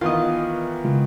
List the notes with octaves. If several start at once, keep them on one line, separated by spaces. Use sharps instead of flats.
D#3 E3 B3 F4 D#5
C#3 G#3 F4